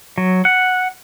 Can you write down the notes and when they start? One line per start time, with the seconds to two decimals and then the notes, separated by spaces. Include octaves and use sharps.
0.18 F#3
0.45 F#5